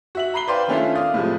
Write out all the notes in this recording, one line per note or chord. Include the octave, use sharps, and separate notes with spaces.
F#4 E5 F#7
A#5 B5 C7 G7
B4 C5 D5 F5 G5 C6
D#3 A3 C#4 D4 E4 F4
D5 F5 D#6
A2 C3 F3 G#3